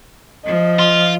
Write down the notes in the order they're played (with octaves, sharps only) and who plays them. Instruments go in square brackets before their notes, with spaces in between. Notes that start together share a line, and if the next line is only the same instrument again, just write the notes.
[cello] F3 [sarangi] D#5
[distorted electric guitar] F4